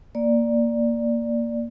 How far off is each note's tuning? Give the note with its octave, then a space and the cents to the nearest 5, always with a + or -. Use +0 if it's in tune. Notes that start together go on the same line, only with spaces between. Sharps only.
A#3 +0 D5 +0